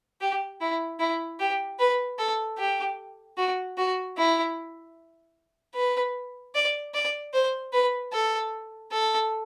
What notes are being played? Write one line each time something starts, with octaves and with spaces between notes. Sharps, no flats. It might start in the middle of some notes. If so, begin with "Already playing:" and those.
G4
E4
E4
G4
B4
A4
G4
F#4
F#4
E4
B4
D5
D5
C5
B4
A4
A4